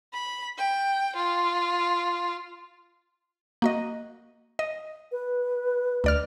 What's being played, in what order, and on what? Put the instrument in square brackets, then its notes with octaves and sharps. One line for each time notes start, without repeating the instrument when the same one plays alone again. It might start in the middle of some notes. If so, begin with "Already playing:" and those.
[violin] B5
G5
F4
[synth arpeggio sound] A#3 F#4 D#5
D#5
[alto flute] B4
[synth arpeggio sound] D2 D5 F6